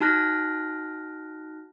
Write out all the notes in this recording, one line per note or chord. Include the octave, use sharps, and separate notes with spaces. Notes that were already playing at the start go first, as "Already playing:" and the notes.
D#4 F#4 A5 F6 F#6 A#6